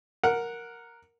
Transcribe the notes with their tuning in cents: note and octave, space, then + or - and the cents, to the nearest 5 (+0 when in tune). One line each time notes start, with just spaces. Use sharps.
A#4 +0 F#5 -10